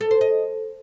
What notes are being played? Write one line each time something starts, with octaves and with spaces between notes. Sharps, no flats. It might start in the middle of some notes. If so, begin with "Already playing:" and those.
A4
C5
D#5